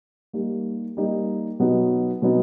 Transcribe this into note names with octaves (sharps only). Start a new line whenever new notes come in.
G3 A#3 D#4 G4
G3 A#3 D#4 G4
B2 F#3 B3 D#4
B2 F#3 B3 D#4